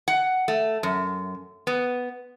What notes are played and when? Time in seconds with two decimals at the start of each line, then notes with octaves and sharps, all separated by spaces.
0.08 F#5
0.48 A3
0.83 F#2
1.67 B3